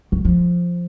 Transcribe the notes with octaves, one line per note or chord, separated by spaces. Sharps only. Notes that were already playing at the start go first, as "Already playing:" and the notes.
F#3
F3